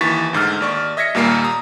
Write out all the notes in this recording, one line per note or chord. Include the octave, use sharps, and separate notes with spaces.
D#2 E3 C#6 A6 B6
D2 G#2 E6 F6
D#2 D5 C#6
D#5 E5 G#6 A#6 B6 C#7
D#2 A#2 G3 A#3 A#4 C7
A#5 D#6